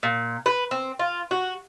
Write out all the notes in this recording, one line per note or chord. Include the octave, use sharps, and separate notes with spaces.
A#2
B4
C4
F4
F#4